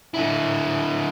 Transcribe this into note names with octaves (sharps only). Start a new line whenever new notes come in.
D3 E4